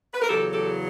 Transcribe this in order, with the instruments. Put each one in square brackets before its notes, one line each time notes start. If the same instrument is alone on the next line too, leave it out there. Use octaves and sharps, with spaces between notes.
[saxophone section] B4
A#4
E2 C#3 F#3 G4 A4
G4 A4